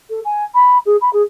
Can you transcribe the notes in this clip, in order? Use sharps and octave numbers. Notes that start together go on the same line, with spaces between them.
A4
G#5
B5
G#4
B5
G#4